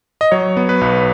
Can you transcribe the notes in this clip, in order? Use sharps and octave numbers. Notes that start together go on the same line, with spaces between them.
D#5
F#3 C#5
B3
B4
B1